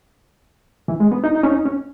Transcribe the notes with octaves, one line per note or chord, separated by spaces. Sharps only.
E3
G#3
B3
D#4
D#4
C#4
D#4
C#4